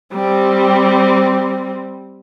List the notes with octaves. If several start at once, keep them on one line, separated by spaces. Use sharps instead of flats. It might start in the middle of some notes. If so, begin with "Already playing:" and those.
G3 C4